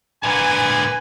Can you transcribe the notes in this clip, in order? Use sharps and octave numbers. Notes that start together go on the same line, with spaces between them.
A#2 D3 B4 G#5